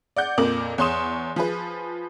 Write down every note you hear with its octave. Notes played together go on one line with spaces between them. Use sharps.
D5 F#5 G6
F2 A#2 A#4 D6 F#7
E2 C#5 C6 D#6 E7
F3 G#4 B4